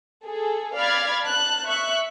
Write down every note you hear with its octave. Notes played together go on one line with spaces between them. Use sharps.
G#4 A4
D5 F5 B5 F6 G#6 A6
A5 F#6
E5 C#6 F#6